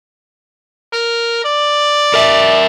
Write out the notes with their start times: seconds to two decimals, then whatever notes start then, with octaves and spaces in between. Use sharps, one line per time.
0.93 A#4
1.45 D5
2.14 A#4 E5